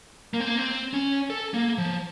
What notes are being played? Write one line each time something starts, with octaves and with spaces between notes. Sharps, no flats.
A#3
C4
A#3
C4
C#4
A4
A#3
F3